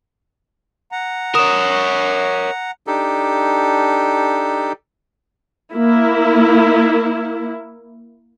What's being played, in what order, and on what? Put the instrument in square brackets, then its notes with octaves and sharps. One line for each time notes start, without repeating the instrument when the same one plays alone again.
[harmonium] F#5 A#5
[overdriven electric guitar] A#4 C#5 [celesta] D#6 E7
[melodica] D4 D#4 G4 A4
[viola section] A#3 E4